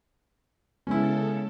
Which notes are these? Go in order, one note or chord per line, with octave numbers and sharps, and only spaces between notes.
C#3 G#3 B3 C#4 E4 A4